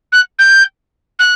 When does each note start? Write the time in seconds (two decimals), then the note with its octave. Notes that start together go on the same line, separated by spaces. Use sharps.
0.12 F#6
0.39 G6
1.19 F#6